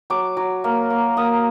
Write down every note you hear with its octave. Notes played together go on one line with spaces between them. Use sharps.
F#3 D6
F#3
A#3
A#3
A#3 D#6